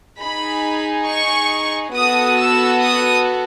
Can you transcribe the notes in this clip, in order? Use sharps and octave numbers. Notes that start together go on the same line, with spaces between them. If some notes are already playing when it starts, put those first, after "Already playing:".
D#4 G#4 B5
C#6
B3 F#4 A4 D#6
E6
D#6